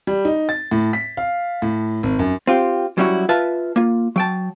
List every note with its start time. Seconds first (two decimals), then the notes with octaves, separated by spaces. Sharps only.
0.07 G3
0.25 D#4
0.49 A6
0.71 A2
0.93 B6
1.17 F5
1.62 A2
2.03 G#1
2.19 F#2
2.47 C4 F4 G4
2.98 F#3 G3 C#4 E4 F#4
3.29 F4 B4 E5 A5
3.76 A#3 F4
4.16 F#3 G5 A5